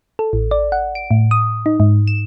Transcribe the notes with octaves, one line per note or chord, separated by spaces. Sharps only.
A4
A1
D5
F#5
D7
A2
D#6
D#4
G#2
E7